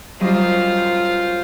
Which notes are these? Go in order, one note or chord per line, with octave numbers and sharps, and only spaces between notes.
F#2 G3 F4 C5 D#5